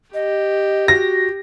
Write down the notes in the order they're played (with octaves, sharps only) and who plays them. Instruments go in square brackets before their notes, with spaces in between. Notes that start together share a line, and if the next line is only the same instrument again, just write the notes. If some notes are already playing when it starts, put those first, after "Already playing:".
[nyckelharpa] G4 [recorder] D#5
[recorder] F#4 [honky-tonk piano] A#6